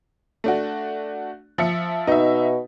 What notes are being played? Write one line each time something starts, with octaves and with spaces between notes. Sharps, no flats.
A3 D4 F#4
F3 E5 C#7
B2 D#4 E5